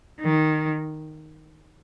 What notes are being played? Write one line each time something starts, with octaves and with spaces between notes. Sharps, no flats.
D#3